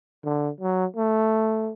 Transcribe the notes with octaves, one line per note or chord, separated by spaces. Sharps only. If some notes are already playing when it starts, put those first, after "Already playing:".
D3
F#3
A3